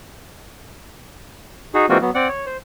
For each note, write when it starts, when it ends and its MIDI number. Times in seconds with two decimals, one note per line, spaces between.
1.74 1.86 63
1.74 1.86 66
1.74 1.86 68
1.89 1.98 52
1.89 1.98 56
1.89 1.98 58
1.89 1.98 60
1.89 1.98 65
1.89 1.98 66
2.01 2.10 54
2.01 2.10 59
2.15 2.28 60
2.15 2.28 74
2.15 2.28 78
2.29 2.46 73
2.46 2.57 72